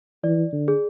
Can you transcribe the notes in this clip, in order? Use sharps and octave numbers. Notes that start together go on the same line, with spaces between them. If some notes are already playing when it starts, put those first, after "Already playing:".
E3 D5
D3
G#4